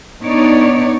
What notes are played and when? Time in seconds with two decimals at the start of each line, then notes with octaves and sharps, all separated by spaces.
0.21 B3 D4 D#4 C#5 D5